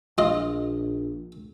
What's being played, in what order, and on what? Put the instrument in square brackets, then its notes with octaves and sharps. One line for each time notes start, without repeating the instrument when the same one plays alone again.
[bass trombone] A#1 [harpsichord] F4 D#5